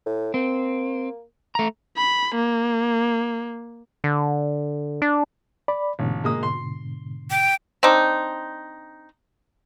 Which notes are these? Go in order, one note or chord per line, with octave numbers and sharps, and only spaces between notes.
A2
A#3 C4
A3 A#5
B5
A#3
D3
D4
D5 B5
A1 G#2 B2 D3
G#3 A#3 D#6
C6
G5
C4 D4 D#4